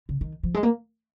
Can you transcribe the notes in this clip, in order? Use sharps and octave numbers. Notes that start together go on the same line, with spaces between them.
C#3
D#3
F3
G#3
A#3